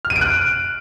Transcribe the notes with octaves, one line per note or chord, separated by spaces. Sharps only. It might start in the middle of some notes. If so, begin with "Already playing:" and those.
F6
D#7
D7
F#6